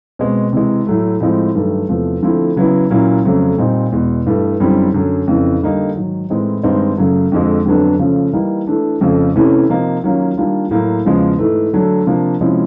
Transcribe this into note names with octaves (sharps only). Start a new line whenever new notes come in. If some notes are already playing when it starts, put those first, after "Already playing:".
B2 G#3 C4
C3 E3 G#3
A2 F#3 A3
A2 F3 G#3 C4
G2 D#3 F#3 A3
E2 C3 F3 A3
D3 F3 A3 C4 E4
C#3 F#3 B3 E4
A#2 F#3 A#3 C#4 E4
F2 C#3 F#3 A3 C4
A#2 G3 C4 D#4
E2 B2 G#3
G2 E3 A3
F#2 D3 G3 C4 E4
F#2 D3 F#3
F2 C#3 E3
D3 G3 A#3 D#4
G#2 D#3 F#3
A2 E3 G#3 C4 D#4
G2 D#3 G#3 C4 D#4
F#2 C#3 F#3 A3
F2 D3 F3 G#3
F2 D3 F#3 B3 D4
C#3 F3 A3 C#4
E3 G3 A#3 D#4
E3 A3 D4
F2 C#3 F3 A3
C3 E3 A3 C#4 E4
C3 F3 A#3 D#4
D#3 F#3 A#3 C#4 F4
D#3 G3 A#3 D4 F4
A2 F#3 A#3
E2 C#3 F3 G#3
G#2 E3 A3
D3 F#3 A3 D4
C3 F3 A#3 D4
C3 F3 G#3 C#4 E4